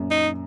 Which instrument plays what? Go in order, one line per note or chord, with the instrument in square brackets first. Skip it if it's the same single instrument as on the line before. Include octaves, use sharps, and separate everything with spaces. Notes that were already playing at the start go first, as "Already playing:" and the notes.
Already playing: [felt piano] F#2 A#2
[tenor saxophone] D#4